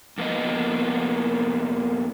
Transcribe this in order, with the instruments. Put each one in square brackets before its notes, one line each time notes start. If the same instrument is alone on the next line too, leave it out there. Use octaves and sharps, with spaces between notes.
[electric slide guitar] F2 A#3 B3 D#5